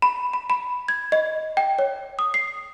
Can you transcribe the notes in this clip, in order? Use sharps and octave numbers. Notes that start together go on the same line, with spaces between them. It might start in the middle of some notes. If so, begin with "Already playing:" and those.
B5
B5
B5
G#6
D#5
G5
C#5
D#6
C7